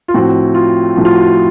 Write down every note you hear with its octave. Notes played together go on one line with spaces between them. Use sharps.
F4
A2 F3 C4 F#4
F4
A2 F3 C4 F#4
F4
F#4